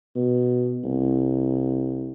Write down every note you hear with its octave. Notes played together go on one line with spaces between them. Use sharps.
B2
C2